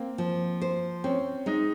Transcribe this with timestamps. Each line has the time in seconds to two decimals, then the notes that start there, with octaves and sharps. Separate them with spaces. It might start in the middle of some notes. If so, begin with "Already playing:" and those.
Already playing: A#3 C4
0.18 F3
0.62 C5
1.04 C4 C#4
1.46 G#3 D#4